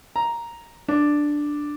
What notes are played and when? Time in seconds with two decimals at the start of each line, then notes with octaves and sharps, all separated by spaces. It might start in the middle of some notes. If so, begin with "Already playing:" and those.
0.16 A#5
0.88 D4